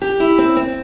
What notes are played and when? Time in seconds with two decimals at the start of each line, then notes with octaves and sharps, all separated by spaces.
0.01 G4
0.20 E4
0.38 C4
0.56 C4